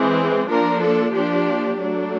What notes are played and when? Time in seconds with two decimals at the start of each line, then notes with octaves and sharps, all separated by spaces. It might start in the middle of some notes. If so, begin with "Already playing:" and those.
Already playing: E3 G#3 C4 G#4
0.49 F3 A#3 D4 A#4
0.81 A4
1.14 F3 A#3 D4 G4
1.78 F#3 A3 D4